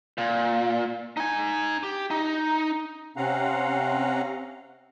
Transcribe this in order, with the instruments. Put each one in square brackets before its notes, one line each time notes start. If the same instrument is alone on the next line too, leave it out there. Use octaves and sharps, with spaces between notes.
[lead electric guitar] A#2
D#4 G#5
G4
D#4
[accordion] C3 C4 C#4 F5 F#5 A#5